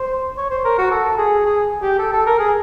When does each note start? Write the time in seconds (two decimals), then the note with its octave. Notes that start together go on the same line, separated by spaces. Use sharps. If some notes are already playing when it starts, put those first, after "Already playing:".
Already playing: C5
0.38 C#5
0.50 C5
0.65 A#4
0.78 F#4
0.91 A4
1.18 G#4
1.46 G#4
1.82 G4
1.99 A4
2.13 A4
2.26 A#4
2.39 G#4